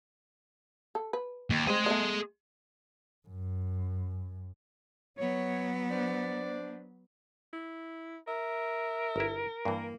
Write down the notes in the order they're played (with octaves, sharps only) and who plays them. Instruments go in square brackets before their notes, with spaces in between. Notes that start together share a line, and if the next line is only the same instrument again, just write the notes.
[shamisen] A4
B4
[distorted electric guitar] D#2
[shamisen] G#3 C4 [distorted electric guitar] G#4 C6
[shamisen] A3 B3 D#5
[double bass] F#2
[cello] F#3 B3 [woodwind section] C#5
[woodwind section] D4 C5 D5
[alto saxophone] E4
[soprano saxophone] A#4 [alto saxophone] E5
[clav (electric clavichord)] G1 E4
[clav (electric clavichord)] G2 E3 [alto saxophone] A#3